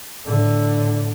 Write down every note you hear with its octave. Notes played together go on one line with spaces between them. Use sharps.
A2 D3